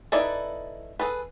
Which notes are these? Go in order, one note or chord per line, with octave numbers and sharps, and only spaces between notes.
D#4 E4 A4 B4 D5
G#4 A4 B4